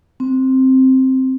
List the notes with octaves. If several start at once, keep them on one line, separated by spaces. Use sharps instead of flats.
C4